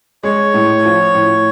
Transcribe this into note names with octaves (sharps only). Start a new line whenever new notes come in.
G#3 C#5
A2
F3
A2